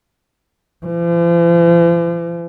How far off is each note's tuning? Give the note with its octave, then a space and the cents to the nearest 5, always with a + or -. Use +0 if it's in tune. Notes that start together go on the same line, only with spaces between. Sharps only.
F3 -45